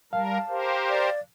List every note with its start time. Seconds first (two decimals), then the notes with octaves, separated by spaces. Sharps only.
0.13 G3 A#4 F5 A5
0.49 G4 A#4 C5
0.89 D5